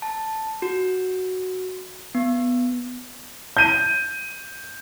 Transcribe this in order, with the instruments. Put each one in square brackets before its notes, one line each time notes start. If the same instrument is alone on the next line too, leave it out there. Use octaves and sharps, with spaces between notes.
[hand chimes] A5
F#4
B3
[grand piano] G6 D#7